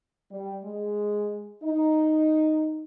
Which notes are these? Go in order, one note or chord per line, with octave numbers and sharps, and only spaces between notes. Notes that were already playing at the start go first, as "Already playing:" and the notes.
G3
G#3
D#4